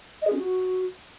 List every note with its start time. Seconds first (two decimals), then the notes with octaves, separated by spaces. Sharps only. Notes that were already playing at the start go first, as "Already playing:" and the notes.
0.22 D#5
0.27 G#4
0.33 C#4
0.38 F#4